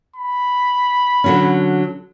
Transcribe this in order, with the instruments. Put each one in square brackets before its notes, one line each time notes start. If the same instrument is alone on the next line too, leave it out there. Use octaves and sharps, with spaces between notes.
[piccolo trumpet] B5
[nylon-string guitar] D3 F#3 C#4